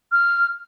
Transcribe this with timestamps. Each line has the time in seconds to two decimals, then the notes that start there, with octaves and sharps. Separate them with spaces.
0.12 F6